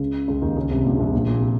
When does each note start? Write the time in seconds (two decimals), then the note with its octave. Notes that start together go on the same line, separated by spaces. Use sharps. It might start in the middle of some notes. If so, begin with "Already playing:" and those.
Already playing: C#2 C#3
0.28 C#2 C#3
0.42 D#2 D#3
0.56 C#2 C#3
0.70 C2 C3
0.85 A#1 A#2
0.99 C2 C3
1.13 A#1 A#2
1.27 A#2
1.39 C3